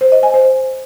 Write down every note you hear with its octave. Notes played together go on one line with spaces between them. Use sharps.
C5
D#5
G#5
C5